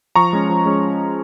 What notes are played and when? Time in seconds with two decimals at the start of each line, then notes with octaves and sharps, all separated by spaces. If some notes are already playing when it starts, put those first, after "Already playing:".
0.16 F3 A#5 C#6
0.33 G#3 C#4
0.50 F3
0.66 G#3 C#4